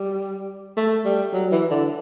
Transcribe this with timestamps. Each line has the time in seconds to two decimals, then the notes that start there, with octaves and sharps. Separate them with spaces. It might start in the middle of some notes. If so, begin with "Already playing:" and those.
Already playing: G3
0.77 A3
1.05 G3
1.33 F#3
1.51 E3
1.70 D3